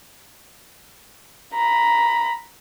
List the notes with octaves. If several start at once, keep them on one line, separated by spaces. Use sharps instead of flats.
A#5 B5